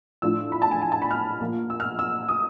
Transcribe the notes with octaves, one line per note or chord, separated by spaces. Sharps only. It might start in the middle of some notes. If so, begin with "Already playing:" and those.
A2 F3 A3 D4 F4 E6
B5
A5
G#5
G#5
A5
B5
F6
A#2 F3 A#3
E6
F6
E6
D#6